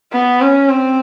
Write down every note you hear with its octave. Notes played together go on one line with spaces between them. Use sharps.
B3
C#4
C4